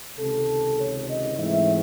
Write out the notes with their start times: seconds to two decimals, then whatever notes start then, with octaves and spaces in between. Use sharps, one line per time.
0.19 C#2 C3 D#3 A4
0.79 C#5
1.09 D#5
1.38 G#2 E3 A3 C4 E5